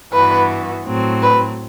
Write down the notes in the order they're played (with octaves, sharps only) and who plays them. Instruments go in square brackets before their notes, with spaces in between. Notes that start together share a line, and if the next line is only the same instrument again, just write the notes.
[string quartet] G2 E3 B3 F#4 [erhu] B4
[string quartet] A2 F#3 C4
[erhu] B4